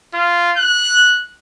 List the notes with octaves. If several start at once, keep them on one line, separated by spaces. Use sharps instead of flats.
F4
F#6